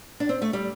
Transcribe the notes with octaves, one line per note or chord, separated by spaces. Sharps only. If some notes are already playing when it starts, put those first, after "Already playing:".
D4
C4
A3
G3